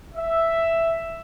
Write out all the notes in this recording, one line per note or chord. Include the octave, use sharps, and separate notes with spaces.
E5